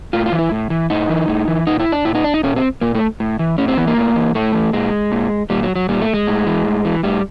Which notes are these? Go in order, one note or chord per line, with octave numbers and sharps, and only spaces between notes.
A2 F4
F4
E3
E4
A2
E3
A2 D#4
E3
A2
E3
A#2 D#4
E4
D4
A#2 E4
D#4
D4
D#4
A#2 C#4
C4
A#2 A#3
A3
A2
E3
A2 C#4
C4
E3 B3
A#3
A2
E3
A2 A3
E3
A#2 G#3
A#2
A#2 G3
F#3
F#3
A#2 G3
A3
G#3
A2
E3
A2
E3
A2 G3